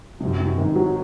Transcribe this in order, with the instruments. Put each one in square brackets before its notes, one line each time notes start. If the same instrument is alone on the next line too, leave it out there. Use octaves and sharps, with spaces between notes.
[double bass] F#2 [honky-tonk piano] C3
[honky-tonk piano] C3
[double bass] G#2 [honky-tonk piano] D#3
[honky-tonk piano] F#3